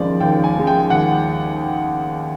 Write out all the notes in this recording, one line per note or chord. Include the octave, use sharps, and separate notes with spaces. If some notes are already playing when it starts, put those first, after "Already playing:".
Already playing: D#2 C#3 F3 G#3 D5
D#2 G5
G#5
C#3 F3 G#3
G5
D#2 F#5